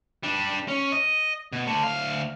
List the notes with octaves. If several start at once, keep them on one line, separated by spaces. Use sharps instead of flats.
G3 D4
C#4
D#5
B2
D3 A3
D2 F5